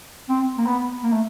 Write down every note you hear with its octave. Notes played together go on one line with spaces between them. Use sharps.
C4
A#3
B3
A#3
A3